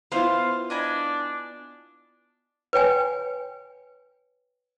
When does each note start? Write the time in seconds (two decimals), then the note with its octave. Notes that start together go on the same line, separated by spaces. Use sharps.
0.12 B3 E4 F4 C5 F5
0.70 D4 D#5 G#5 B5
2.73 B4 C#5 G5 G#5